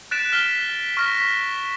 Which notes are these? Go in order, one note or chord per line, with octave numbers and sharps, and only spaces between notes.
F#6 A6 B6 D7 E7
F6 F#6 B6 G7
C#6 F6 A#6 B6
B6